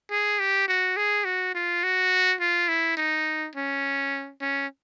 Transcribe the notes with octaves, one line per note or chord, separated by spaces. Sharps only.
G#4
G4
F#4
G#4
F#4
F4
F#4
F4
E4
D#4
C#4
C#4